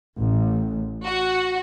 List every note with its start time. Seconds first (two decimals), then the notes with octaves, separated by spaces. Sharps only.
0.17 A1
1.05 F#4